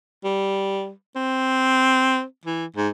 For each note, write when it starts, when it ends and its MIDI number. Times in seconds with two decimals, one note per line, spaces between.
0.24 0.91 55
1.16 2.23 60
2.45 2.66 52
2.76 2.89 44